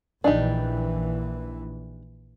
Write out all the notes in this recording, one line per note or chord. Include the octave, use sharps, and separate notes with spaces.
A#1 E3 D4 D#4 G4